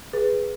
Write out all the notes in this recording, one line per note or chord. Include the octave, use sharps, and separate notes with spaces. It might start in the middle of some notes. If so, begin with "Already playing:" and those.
G#4 B4